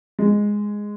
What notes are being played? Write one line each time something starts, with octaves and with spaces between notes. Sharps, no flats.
G#3